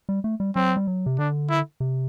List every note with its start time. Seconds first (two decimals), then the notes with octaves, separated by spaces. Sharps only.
0.09 G3
0.24 A3
0.40 G3
0.56 F#3 C4
0.77 G3
0.87 F#3
1.06 C3
1.18 D3 D4
1.50 E4
1.80 C3